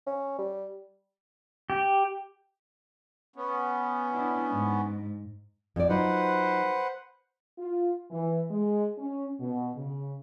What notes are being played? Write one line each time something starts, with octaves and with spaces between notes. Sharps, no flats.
C#4
G3
G4
B3 C#4
D4 E4
G#2
F2 D5
F#3 D#4 F4 B4 C5 F#5
F4
E3
G#3
C#4
B2
C#3